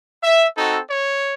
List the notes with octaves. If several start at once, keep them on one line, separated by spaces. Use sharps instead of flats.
E5
C4 D#4 F#4 A4
C#5